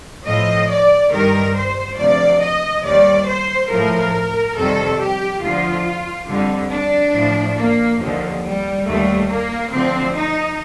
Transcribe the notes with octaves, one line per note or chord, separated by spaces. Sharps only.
A2 F3 D#5
D5
G2 D#3 G3 A#4
C5
D2 C3 F3 D5
D#5
D#2 D#3 G3 D5
C5
A2 F3 A#4
F2 C3 D#3 G3 A4
G4
D2 D3 F3 F4
F2 D3 G3
D4
A2 F3
A#3
D#2 D3 F3
G3
D#2 D3 G3 A3
A#3
D2 D3 F3 C4
D#4